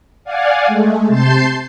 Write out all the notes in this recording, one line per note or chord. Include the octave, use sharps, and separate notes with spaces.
D5 F5 F#5 G#5
G#3 A3
C3 A5 C6 G6 A6 C7